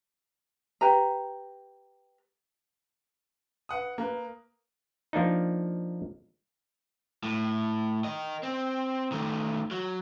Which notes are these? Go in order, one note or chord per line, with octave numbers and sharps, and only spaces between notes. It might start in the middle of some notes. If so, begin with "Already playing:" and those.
G4 B4 A#5
B4 F#5 D#6
A#3 B4
F3 A#3 D4 D#4
A2
A#4 D#5
C4
D#3 A3
F#3